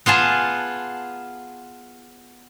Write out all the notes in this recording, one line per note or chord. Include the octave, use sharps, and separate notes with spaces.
B3 F4 G#4 A5